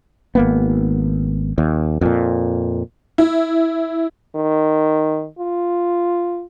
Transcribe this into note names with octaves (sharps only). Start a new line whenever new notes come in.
G#1 A#3 B3
D#2
F2 A#2
E4
D#3
F4